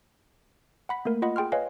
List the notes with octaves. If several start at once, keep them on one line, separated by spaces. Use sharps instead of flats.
F#5 B5 B6
A3 A#3 A#4
F4 D#5 F#5 B5
G#4 G5 C6 F6
B4 C#5 D#5 F5 G#5